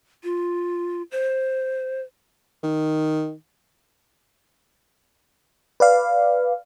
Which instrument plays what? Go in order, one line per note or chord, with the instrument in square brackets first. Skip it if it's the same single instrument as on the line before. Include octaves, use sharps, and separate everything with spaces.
[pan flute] F4
C5
[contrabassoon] D#3
[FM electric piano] B4 D5 F5